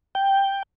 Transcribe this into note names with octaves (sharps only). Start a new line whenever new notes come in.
G5